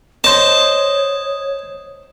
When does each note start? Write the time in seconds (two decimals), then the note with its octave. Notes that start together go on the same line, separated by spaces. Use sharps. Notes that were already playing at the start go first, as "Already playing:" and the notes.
0.24 C5 C#5 D#5 A5